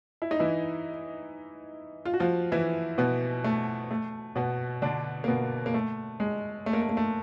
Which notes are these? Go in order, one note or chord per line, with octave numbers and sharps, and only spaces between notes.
E4
D#4
E3 E4
F4
F#4
F3 F4
E3 E4
B2 B3
A3
A3
B2 B3
D3 D4
A#3
B2 B3
A#3
A3
G#3
A3
A#3
A3
A#3
A3